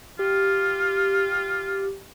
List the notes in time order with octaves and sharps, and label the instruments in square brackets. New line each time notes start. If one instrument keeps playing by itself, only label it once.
[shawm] F4 [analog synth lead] G4